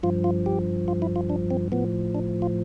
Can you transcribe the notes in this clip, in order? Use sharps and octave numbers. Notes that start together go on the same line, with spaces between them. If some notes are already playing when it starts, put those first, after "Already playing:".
G2 F3 F4
F4
G4
F4
E4
F4
D4
C4
A2 F3 B3
D4
F4